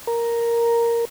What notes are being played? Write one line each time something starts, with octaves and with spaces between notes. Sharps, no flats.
A#4